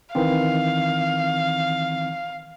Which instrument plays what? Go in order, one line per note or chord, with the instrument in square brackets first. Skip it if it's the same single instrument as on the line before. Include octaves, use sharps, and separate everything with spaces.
[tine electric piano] D#3 E3 C4 [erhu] F5